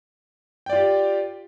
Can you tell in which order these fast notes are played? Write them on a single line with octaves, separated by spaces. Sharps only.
G5 D5 F4 G4